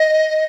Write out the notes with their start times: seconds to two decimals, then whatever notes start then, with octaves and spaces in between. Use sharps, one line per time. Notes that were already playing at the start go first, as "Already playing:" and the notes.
Already playing: D#5